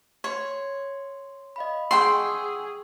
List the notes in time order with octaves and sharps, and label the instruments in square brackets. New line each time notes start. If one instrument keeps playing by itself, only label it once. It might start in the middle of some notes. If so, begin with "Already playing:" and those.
[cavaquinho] C#5 [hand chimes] C6
[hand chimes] D#5 F5 B5
[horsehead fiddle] G#4 [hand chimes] F#5 C#6 E6 [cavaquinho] G5 C6